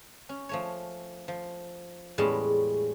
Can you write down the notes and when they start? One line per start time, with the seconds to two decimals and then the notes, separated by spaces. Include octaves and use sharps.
0.29 C#4
0.49 F3 A3 C#5
1.28 F3
2.18 E2 A2 G3 G#3 C#4 A5